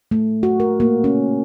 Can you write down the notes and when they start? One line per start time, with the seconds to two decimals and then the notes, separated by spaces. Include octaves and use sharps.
0.11 A3
0.43 F#4
0.60 A#4
0.80 A#3
1.04 C#4